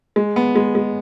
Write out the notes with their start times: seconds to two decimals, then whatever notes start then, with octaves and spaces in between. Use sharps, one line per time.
0.16 G#3
0.36 B3
0.56 G#3
0.75 G#3